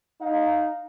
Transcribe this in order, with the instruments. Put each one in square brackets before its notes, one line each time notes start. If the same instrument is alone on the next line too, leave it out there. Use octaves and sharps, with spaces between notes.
[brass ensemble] D#4 F5